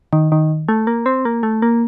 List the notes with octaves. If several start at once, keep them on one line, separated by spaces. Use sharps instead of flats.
D#3
D#3
A3
A#3
C4
A#3
A3
A#3